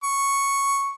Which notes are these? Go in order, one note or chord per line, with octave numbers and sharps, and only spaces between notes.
C#6